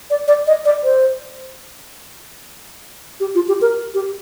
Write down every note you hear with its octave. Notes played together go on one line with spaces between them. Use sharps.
D5
D5
D#5
D5
C5
G4
F4
G4
A#4
G4